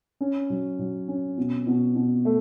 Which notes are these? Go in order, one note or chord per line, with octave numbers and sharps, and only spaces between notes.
C#4
F#3
F#3
C#4
B2
B2
B2
A3